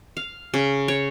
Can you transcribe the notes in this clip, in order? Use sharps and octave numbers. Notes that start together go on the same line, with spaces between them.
F5
C#3
C#5